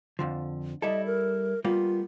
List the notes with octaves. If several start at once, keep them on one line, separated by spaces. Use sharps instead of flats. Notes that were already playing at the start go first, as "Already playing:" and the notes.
F2 D3 F3
G3 E4 A4 D#5
A#4
G3 A#3 B3 F4